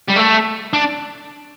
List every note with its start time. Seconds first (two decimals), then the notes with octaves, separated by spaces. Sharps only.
0.08 G3
0.16 A3
0.73 D4